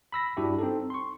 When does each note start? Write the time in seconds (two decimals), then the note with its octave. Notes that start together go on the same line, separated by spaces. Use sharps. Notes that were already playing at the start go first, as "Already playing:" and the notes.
0.12 B5 E6 A#6 B6
0.37 G2 G3 D4 E4 F#4 G4
0.59 C4 D#4 A4
0.90 C6 C#6